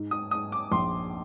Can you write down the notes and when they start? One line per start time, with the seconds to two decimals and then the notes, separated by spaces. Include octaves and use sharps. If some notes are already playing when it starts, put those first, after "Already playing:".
Already playing: G#2
0.11 D#6
0.31 G#2 D#6
0.52 D6
0.71 A#1 C6